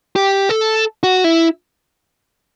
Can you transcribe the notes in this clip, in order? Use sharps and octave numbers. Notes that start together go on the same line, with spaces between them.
G4
A4
F#4
E4